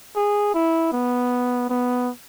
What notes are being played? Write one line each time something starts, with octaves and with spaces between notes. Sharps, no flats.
G#4
E4
B3
B3